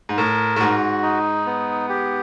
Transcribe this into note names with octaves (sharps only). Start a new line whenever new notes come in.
G#2
A2 A#4
A2
G#2 F#4
D#4
B3
G4